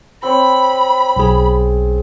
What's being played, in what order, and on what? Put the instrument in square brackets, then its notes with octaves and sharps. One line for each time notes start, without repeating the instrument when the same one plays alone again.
[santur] C4 C#5 [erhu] B5
[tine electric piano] B1 G#4